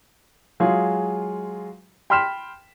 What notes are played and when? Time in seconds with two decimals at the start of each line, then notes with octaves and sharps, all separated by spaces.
0.60 F#3 G#3 F4 G#4
2.10 G5 B5 C6 F6 B6 E7